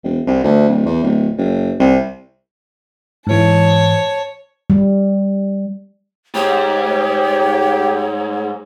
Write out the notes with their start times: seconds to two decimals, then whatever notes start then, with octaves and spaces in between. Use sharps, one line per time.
0.04 E1
0.27 C2
0.44 D2
0.69 D1
0.85 E2
1.03 D1
1.38 F#1
1.80 C2
3.27 G#2 E3 C#5 A5
4.70 G3
6.35 G#2 G4 C#5